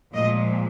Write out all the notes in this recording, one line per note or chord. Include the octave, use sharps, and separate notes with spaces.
A#2 F3 G#3 D#5